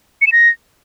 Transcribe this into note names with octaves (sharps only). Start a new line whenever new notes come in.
C#7
E7
A#6